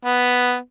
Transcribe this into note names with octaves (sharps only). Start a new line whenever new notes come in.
B3